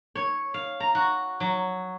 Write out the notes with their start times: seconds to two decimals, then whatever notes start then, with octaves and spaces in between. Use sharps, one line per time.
0.15 C#5
0.54 F5
0.80 A#5
0.95 F#4
1.40 F#3